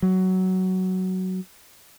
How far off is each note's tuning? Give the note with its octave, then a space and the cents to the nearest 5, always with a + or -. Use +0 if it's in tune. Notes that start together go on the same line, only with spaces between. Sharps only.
F#3 +10